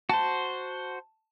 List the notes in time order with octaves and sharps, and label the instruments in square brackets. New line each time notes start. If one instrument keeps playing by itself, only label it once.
[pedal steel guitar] F#4 C5 [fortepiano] A5